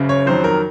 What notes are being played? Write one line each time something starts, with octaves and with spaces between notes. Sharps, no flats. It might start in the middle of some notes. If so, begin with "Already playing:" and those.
Already playing: F#1 C#3
C#5
F2 D#3 F#3 C5
A#4